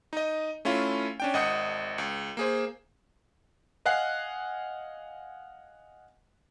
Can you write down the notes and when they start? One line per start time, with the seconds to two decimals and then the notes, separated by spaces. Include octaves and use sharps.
0.13 D#4 D#5
0.65 A3 C#4 E4 F4
1.20 C#4 D4 G5
1.34 G#1 D#5 F#5 D#6 G6 C#7
1.98 C#2
2.37 A#3 G#4 C5
3.85 D#5 F5 F#5 G#5 F#6 C7